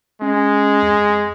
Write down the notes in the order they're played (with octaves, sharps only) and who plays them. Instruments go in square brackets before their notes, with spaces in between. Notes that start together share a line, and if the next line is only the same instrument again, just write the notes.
[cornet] G#3 [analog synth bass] C#4
[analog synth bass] F2